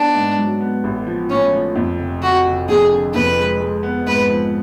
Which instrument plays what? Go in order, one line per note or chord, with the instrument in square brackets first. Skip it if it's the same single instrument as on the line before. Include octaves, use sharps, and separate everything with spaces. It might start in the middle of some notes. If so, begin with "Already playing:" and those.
Already playing: [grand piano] B3 [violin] D4
[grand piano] G#2
F#3
B3
A1
F3
[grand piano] A2 [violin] C#4
[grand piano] F3
F2
F1
[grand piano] F1 [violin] F#4
[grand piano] F1
[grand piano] F2 [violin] G#4
[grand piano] D3
[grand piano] F2 [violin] B4
[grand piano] G#3
G#3
B3
[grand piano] G#2 [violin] B4
[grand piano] F3